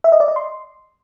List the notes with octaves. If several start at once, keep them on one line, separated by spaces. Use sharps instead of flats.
E5
D#5
D5
D#5
C6